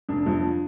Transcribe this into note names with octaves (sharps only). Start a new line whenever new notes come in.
F1 D4
F2 F3